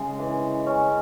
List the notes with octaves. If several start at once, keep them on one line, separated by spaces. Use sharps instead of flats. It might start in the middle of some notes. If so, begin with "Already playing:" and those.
Already playing: C#3 G#3
E3
C#4